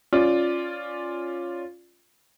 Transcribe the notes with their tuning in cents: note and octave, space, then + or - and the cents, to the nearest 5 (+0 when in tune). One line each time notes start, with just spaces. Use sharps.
C#4 -5 F4 +0 D5 +0